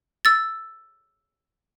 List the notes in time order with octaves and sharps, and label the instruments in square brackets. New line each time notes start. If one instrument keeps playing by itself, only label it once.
[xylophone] E6 A6